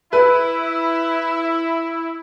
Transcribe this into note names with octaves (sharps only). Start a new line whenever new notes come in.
E4 B4